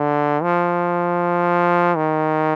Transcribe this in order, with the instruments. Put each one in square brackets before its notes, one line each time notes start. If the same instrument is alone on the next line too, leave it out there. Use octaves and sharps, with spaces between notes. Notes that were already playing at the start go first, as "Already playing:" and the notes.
Already playing: [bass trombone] D3
F3
D#3